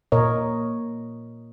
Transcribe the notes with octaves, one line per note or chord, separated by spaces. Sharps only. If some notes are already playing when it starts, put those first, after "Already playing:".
A#2 A#4 C#5 D#5